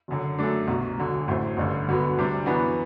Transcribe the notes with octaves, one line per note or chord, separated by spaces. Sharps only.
F#1 F#2 D3
F#2 F#3 A3 D4
C2 B2 F#3
E1 D2 D3 F#3
A1 A2 F#3 C4
A1 G2 D3
D2 D3 F#3 B3 F#4
D2 C3 G3 D4
F#2 E3 B3 D4 F#4